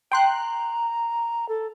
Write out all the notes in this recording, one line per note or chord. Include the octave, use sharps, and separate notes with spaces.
G5 A#5 C6 F#6
A4